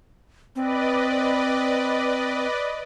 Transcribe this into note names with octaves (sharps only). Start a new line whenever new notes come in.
C4 B4 D5 D#5